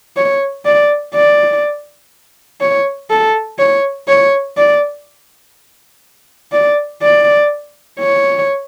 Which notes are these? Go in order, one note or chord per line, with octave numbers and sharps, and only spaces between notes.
C#5
D5
D5
C#5
A4
C#5
C#5
D5
D5
D5
C#5